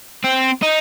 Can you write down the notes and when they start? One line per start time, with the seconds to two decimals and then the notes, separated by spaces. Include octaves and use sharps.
0.24 C4
0.63 D#4